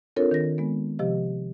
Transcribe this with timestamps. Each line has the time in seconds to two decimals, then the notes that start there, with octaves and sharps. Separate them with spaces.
0.16 C4 D4 F4 A4 A#4 C#5
0.31 D#3 A#6
0.58 G#3 B3
0.99 C3 F3 G4 D#5